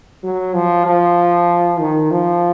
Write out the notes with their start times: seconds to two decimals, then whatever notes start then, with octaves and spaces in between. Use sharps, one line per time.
0.23 F#3
0.54 F3
0.86 F3
1.80 D#3
2.11 F3